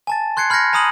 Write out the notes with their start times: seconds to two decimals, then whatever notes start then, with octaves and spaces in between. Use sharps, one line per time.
0.07 G#5 A5 A6
0.37 C6 F#6 G#6 C7 C#7
0.50 B5 F6 G6 G#6 A#6 C#7
0.73 G#5 A#5 B5 D#6 D#7 F#7